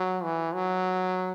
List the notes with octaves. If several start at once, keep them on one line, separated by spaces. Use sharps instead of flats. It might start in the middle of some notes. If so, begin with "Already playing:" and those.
Already playing: F#3
E3
F#3